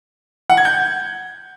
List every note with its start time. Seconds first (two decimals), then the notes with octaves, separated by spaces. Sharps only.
0.50 F#5
0.57 G#6
0.65 G6